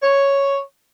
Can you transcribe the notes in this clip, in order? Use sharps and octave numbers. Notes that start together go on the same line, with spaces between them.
C#5